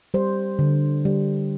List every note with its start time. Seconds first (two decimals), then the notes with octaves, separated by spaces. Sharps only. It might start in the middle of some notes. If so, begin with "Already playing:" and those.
0.14 G3 C5
0.59 D3
1.05 G3